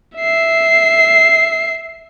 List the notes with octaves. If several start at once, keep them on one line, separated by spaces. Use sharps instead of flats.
E5 C7